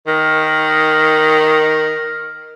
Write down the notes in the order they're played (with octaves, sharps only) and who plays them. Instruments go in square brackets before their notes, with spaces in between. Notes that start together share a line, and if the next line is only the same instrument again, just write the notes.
[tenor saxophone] D#3 [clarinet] A#4